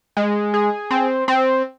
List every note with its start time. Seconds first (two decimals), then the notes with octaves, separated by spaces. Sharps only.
0.17 G#3
0.54 G#4
0.91 C4
1.28 C4